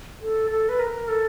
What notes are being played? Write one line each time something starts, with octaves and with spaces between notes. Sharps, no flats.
A4
A4
B4
A#4
A4